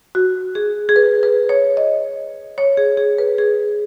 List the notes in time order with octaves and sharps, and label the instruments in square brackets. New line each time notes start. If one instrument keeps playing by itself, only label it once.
[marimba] F#4
G#4
G#4
B4
B4
C#5
D#5
C#5
G#4
G#4
B4
G#4